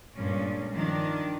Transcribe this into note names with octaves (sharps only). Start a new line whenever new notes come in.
G2 A#2 G#3 C#4
D#3 F3 D4